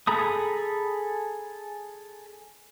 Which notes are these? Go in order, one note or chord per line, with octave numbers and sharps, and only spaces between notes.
G#4 A4 A#5 B5 D#6